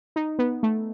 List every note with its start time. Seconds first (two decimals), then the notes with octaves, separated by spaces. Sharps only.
0.16 D#4
0.39 B3
0.63 A3